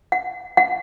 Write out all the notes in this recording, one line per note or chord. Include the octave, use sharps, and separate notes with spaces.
F#5
F#5